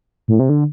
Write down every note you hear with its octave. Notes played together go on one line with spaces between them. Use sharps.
A2
C3
D3